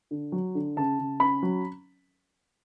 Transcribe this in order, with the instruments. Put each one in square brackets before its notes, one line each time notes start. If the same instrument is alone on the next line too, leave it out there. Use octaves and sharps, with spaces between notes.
[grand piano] D3
F#3
D3
C#3 A5
C#3
C#4 B5
F#3